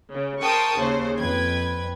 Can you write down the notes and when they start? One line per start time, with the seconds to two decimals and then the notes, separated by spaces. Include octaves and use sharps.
0.11 C#3
0.43 A#4 C5 G5 A5 C#6 D#6
0.76 D#2 C#3 C5
1.18 F2 B4 G5 G#6